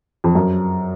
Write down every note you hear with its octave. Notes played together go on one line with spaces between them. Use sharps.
F2
F#2